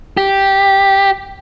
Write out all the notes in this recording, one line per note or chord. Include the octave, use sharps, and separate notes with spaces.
G4